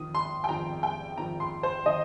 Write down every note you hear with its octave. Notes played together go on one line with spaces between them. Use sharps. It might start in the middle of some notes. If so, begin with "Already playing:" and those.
Already playing: F2 D#3 D#6
C6
G5
F2 D#3 A#5
G5
F2 D#3 A#5
C6
C5
D#3 D#5